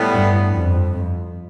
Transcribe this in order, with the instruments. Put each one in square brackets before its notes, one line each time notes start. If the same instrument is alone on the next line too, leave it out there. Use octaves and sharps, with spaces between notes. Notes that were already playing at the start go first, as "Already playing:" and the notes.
Already playing: [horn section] A2 G3 B3
[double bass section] G2
F2